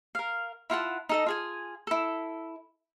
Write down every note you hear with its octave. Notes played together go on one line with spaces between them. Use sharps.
A#4 F5
E4 F4 F#5 A5
D#4 A4 D#5
F4 G#4 G#5
E4 A4